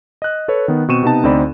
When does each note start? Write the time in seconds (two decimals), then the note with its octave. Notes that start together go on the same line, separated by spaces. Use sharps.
0.22 D#5 F#6
0.48 A4 B4 C#5
0.68 D#3 B3
0.88 B2 C4 C#6 D#7 E7
1.03 C3 B3 D#4 A5
1.23 D2 D3 C4 D#4 D5 B5